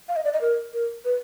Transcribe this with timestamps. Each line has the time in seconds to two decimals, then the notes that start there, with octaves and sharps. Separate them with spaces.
0.09 F5
0.16 D#5
0.24 D5
0.33 D#5
0.41 A#4
0.74 A#4
1.05 B4